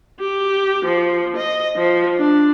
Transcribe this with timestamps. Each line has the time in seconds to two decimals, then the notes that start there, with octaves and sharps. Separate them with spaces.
0.20 G4
0.85 F3
1.37 D#5
1.77 F3
2.17 D4